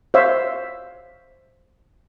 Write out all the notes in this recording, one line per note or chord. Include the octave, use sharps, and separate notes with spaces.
C5 C#5 E5 F5